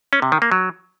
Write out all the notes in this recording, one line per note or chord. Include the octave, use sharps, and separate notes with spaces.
C#4
C3
D#3
A#3
F#3